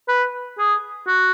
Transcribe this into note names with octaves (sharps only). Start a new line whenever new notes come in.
B4
G#4
F#4